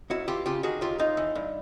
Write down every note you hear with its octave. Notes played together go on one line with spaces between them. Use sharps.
D#2 E4 F#4
E3 F4 G4
C#3 F4 G4
D#3 F#4 G#4
D#2 F4 G4
D#2 D#4 F4
E3
G2